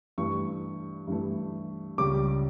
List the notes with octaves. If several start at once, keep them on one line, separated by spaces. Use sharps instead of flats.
G2 E3 A3 C#6
G2 E3 A3
C#2 C#3 G3 D6